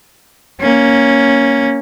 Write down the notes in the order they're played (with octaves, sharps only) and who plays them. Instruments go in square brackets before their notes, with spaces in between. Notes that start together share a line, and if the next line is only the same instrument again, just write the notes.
[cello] A#3 C#4